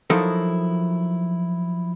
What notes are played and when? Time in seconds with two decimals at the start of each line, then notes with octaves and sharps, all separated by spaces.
0.10 F3 F#3 D#4 E4 A4 A#4